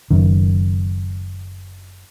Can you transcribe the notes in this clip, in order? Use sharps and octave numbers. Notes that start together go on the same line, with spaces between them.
F#1 F#2 D#3